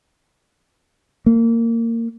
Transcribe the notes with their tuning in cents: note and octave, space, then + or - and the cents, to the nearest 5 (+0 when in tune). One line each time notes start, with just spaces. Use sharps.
A#3 -20